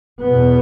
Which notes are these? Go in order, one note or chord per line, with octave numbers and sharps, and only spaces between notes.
E2 B2 B3